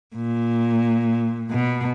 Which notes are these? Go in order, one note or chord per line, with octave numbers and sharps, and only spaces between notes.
A#2
B2